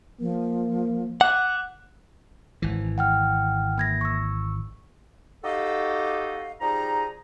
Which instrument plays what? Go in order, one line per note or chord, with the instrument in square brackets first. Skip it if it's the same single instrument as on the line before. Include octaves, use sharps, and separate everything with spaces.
[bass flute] F3 [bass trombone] A#3
[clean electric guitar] F#5 [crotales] D6 F#6
[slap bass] G#1 E3
[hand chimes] F#5 G5 F6
A#3 G#6 A#6
C#6 E6
[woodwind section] D#4 F#4 G4 A4 D#5 F5
F3 G3 D#4 G#4 A#5